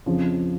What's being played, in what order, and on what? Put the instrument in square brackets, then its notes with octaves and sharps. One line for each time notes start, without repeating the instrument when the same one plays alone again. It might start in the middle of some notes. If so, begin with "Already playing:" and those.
[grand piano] F2 C#3 F3